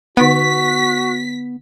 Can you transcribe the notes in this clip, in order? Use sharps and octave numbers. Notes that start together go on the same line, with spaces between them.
D3 B3 D#4 F#4 F#5 B6